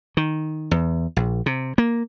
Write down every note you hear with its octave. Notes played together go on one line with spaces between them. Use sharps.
D#3
E2
A#1
C3
A#3